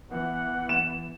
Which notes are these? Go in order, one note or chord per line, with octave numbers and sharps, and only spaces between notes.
E3 B3 F#5
E7